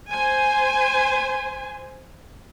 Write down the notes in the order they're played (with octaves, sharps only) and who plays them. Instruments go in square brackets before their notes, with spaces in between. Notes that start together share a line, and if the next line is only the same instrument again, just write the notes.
[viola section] C5 G#5